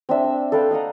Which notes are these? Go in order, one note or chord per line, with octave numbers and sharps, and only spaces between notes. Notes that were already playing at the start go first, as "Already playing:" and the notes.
C4 D4 E5
E6
A4 B4 F5 G5
D#5 F5 F#5 A#5